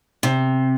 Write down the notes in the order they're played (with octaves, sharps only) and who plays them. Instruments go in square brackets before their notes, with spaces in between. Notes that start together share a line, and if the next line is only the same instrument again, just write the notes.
[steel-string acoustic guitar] C3